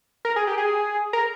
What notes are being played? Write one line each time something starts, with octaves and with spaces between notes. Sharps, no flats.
A#4
G#4
G4
G#4
A#4